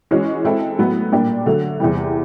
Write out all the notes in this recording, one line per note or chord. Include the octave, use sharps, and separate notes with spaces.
E3 G#3 C#4 F#4
G#3 C4 E4 A4
A2 F#3 B3
A#2 G3 A#3 D4 G4
D3 F#3 A3
E2 C3 E3 G3